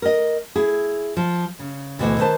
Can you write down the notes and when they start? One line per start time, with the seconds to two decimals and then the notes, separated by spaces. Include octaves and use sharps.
0.02 A#4 D#5
0.56 E4 G#4
1.17 F3
1.59 C#3
1.99 D2 B2 D#3 E3
2.19 D#3 B4 C5 A5